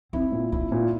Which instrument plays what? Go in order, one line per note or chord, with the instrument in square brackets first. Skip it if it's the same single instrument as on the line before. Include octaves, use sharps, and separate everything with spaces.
[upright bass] C4 [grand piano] E4
[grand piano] A#2
[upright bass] D4 [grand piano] E4
[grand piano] A#2